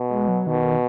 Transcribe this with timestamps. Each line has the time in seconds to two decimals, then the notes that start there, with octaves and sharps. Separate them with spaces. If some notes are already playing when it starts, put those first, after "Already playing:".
Already playing: B2
0.10 G#3
0.28 F#3
0.47 B2 D#3